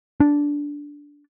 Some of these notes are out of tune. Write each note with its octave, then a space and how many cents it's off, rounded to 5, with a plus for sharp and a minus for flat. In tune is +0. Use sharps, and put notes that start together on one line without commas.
D4 -10